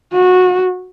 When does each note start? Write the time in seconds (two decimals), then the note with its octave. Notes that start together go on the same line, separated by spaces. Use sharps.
0.13 F#4